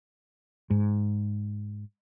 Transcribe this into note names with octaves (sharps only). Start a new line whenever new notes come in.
G#2